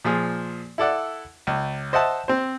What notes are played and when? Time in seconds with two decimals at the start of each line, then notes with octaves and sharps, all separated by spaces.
0.05 A#2 F3 G#4
0.78 E4 A4 D5 F#5
1.47 C#2
1.93 C5 D#5 E5 F#5 A5
2.28 C4 C5